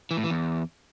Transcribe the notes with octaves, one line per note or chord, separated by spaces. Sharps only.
E3
A2
E3
E2